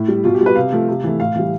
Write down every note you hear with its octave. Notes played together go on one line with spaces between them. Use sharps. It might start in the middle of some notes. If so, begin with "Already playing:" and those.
Already playing: A2 E4
G3
B2 F4
G4
G3
B4
C3 F5
F3 A3
C3
E3 A3
A2 F5
E3 G3